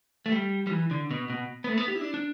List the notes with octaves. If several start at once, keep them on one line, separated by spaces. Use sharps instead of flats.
A3
G3
G3
E3
D3
B2
B2
B3
A3
B3
G4
E4
D4
D4